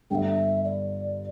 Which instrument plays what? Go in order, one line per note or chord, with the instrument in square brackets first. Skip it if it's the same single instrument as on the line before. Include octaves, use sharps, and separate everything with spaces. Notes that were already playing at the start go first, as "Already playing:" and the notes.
[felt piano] G1 G2 D3 G3 [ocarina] E5 G5
[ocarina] D5